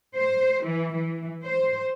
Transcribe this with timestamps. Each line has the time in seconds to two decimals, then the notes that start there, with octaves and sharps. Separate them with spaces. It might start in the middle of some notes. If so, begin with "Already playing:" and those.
0.16 C5
0.64 E3
0.93 E3
1.44 C5